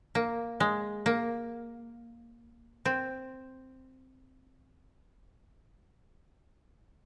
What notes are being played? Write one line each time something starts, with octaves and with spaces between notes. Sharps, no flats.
A#3
G#3
A#3
C4